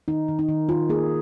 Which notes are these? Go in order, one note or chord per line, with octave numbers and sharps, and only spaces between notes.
D#3 D#4
D#3
D#4
D#3
D#3 F4
A#3 G#4